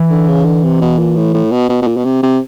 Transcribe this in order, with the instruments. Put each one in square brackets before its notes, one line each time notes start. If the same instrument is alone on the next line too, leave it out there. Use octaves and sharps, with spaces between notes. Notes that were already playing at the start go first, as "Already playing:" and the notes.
Already playing: [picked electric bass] E3
[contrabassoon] D3
C#3
D3
C3
B2
A#2
A2
A2
B2
B2
B2
A#2
B2
C3
C3